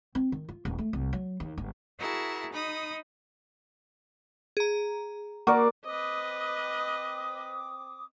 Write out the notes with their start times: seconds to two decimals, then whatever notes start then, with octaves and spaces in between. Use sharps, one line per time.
0.15 C4
0.32 D#3
0.49 F4
0.65 D#1
0.78 A3
0.93 C2
1.13 F#3
1.40 D#2
1.58 G1
1.98 E4 F#4 G#4 A#4 A5
2.51 D#4 B5 D#6
4.57 G#4 A#5
5.47 A#3 F#4 A#4 D5
5.85 C4 B4 D#5 D6 D#6